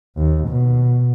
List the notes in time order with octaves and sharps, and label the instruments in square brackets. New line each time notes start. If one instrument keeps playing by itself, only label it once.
[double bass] D#2
B2